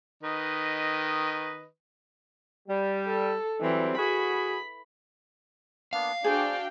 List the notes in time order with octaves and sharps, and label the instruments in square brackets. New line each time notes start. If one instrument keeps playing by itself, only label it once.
[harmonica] D#3 B4 D#5
[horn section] G3
[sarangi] A4
[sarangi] E3 [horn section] F#3 G3 C4
[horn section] F#4 G#4 [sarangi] B5
[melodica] A#3 B3 D4 [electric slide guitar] F5
[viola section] D4 F#4 G5 [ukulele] G#4 [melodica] C5 D5